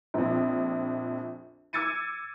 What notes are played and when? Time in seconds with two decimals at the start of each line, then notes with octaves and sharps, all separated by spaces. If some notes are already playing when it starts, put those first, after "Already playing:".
0.14 A#1 F2
1.73 D6 E6 G#6 A6 C#7 D#7